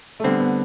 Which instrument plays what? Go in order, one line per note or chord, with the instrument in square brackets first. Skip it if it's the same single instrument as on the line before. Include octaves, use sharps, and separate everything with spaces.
[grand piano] A3
[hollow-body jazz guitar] D3 G3 C4 [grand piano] B3
[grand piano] B3